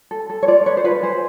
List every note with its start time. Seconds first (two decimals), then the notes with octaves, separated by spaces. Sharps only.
0.11 A4
0.30 A4
0.43 C#5
0.47 F4 D5
0.66 B4 C#5
0.77 C5
0.84 F4 B4
1.03 G#4 C5